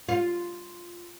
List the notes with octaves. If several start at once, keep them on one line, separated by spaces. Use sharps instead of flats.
F4